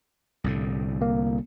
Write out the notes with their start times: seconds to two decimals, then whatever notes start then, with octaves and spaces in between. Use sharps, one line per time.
0.44 C2 A2 D3
1.02 A#3